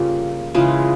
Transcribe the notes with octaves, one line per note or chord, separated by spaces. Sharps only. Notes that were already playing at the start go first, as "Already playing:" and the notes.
Already playing: C#3 G3 A#3 F4
C#3 E3 G#3 F4